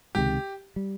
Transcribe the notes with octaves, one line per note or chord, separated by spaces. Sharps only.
C#2 C3 D#3 G#3 G4
G3